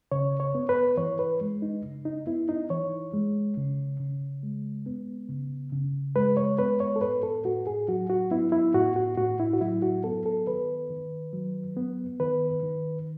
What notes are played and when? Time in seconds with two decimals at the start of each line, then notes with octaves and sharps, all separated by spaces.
0.12 C#3 C#5
0.40 C#5
0.55 B3
0.69 B4
0.97 E3 C#5
1.19 B4
1.41 G#3
1.62 D#4
1.84 C#3
2.05 D#4
2.27 B3 E4
2.49 D#4
2.70 E3 C#5
3.14 G#3
3.57 C#3
4.00 C#3
4.43 G#3
4.86 B3
5.29 C#3
5.73 C#3
6.16 G#3 B4
6.37 C#5
6.59 B3 B4
6.80 C#5
6.96 A4
7.01 A2 B4
7.23 A4
7.45 A2 F#4
7.67 G#4
7.88 F#3 F#4
8.10 F#4
8.31 B3 E4
8.52 E4
8.74 A2 F#4
8.96 F#4
9.18 A2 F#4
9.40 E4
9.53 F#4
9.61 F#3 E4
9.82 F#4
10.04 B3 A4
10.26 A4
10.47 D#3 B4
10.90 D#3
11.33 F#3
11.77 B3
12.20 D#3 B4
12.63 D#3